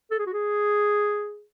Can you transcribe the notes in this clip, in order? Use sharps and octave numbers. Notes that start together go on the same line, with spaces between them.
A4
G#4
F#4
G#4